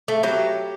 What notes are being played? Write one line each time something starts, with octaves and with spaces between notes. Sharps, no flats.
A3
F#3 G4